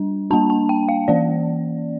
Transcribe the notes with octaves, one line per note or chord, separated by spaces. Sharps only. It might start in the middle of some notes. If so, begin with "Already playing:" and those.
Already playing: G3 D4
G3 A#3 D4 A5
A5
G5
F5
E3 A#3 C#4 D5